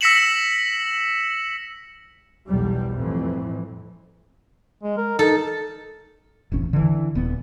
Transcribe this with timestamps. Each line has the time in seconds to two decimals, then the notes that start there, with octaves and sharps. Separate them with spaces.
0.01 E6 A#6 B6 C#7 E7 F#7
2.48 B1 E2 B2 G3
2.91 F2 A2 E3
4.83 G#3
4.97 A#4
5.19 D#4 A4
6.52 E1 A1 C#4
6.73 D3 E3
7.15 D#1 B3